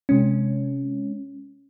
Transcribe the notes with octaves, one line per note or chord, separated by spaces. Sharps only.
C3 G#3 C#4